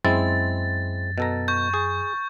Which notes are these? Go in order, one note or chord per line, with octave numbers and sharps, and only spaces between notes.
F#2 G#3 C4 E4 A6
B2 A4 A#5
C#6 G6
G#4